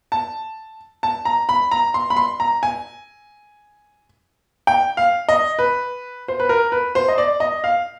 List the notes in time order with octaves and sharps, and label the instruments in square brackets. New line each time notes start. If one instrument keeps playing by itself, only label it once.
[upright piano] A5
A5
A#5
B5
A#5
C6
B5
C6
A#5
G#5
G5
F5
D#5
B4
C5
B4
A#4
B4
C5
D#5
D5
D#5
F5